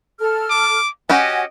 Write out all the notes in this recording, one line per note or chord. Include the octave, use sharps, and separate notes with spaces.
A4 F6
D6
C#4 F#4 G4 D#5 F#5 G#5